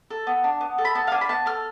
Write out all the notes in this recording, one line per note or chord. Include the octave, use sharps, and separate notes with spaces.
A4
B3
D4
B3
A4
B5
B3 A5
F5
D4 G#5
B5
B3 A5
A4 F6